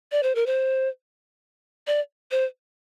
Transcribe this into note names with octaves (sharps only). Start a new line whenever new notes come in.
D5
C5
A#4
C5
D5
C5